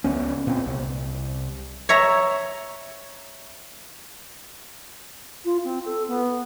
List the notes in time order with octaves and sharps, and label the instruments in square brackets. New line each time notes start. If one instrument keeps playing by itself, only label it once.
[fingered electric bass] C#2 B3 C#4
A#2 C4
C2
[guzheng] C#5 E5 A#5
[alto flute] F4
C4
A4
B3